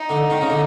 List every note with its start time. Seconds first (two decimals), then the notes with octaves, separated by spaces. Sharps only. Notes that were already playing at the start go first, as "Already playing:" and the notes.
Already playing: D#4
0.09 D3
0.30 D#3
0.41 C#3
0.50 D3